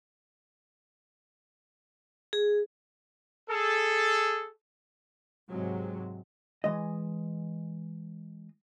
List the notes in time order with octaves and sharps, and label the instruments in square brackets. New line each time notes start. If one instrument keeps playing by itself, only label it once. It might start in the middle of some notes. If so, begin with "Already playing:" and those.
[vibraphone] G#4
[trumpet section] G#4 A4
[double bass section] G#2 C3 F#3 G#3
[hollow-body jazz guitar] E3 G#3 D#5